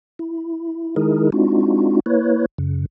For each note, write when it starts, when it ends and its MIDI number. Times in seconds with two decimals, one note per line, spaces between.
0.19 0.96 64
0.96 1.30 51
0.96 1.30 56
0.96 1.30 63
0.96 1.30 64
0.96 1.30 68
0.96 1.30 70
1.32 2.00 56
1.32 2.00 60
1.32 2.00 62
1.32 2.00 63
1.32 2.00 65
1.32 2.00 66
2.06 2.46 58
2.06 2.46 64
2.06 2.46 71
2.06 2.46 73
2.58 2.86 42
2.58 2.86 49